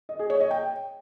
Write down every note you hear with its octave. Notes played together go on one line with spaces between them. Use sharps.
D#5
G#4
C#5
D#5
G5